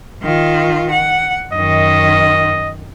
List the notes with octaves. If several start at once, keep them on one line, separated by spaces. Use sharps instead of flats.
D#3 F4
F#5
F#2 D#3 D#5